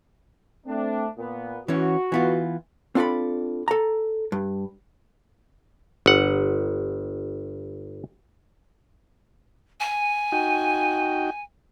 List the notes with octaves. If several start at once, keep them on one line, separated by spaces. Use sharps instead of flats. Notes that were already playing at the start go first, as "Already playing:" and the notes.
A3 C4 D4
A#2 B3
E3 C#4 F#4
E3 B3 F4
C4 D4 F4 A4 D5 B5
A4 A#5
G2
G1 F#5
G#5
D#4 F#4 G5